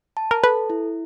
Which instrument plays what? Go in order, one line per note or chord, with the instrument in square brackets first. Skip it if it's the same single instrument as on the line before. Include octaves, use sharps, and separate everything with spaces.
[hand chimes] A5
[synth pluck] A#4
[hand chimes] A4 [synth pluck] B4
[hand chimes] E4